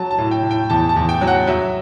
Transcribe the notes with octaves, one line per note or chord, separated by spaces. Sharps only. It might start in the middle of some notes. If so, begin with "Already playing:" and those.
Already playing: F#3 A5
A5
A2
G5
A2
G5
E2 A5
A5
E2
G5
F#3
F#5
F#3 E5